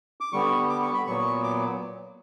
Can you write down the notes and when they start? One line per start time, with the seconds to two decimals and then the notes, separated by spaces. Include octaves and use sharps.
0.21 D6
0.33 D3 G3 B3 C#6
0.69 D6
0.82 C#6
0.94 B5
1.07 A#2 F#3 B3 C#6
1.43 D6